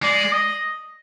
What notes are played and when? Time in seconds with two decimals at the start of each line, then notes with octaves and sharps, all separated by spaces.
0.03 G#3 D5
0.33 D#5